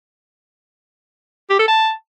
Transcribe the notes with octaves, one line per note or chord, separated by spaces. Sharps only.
G4
A4
A5